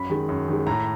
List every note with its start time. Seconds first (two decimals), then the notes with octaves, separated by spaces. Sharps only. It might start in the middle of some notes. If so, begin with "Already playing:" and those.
Already playing: F#2 B5
0.10 D#3 G#3
0.29 F#2
0.48 D#3 G#3
0.67 A2 A#5